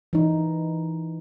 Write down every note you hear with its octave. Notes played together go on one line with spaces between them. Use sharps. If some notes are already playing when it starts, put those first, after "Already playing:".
E3 D#4